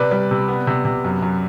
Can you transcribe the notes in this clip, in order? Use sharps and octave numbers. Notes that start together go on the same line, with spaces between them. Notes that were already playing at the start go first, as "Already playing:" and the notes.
Already playing: C3 B4 D5
G3
C3
B3
C3
C3
F#2
F#2